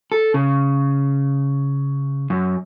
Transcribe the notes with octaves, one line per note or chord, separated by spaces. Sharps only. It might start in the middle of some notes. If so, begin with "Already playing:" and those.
A4
C#3
F#2